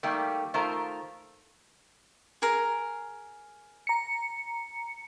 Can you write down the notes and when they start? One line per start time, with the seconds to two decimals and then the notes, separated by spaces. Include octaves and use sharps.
0.03 D#3 G3 A3 A#3 G4
0.54 D#3 A3 F4 A#4 C5
2.42 G#4 A#4
3.87 A#5 C#7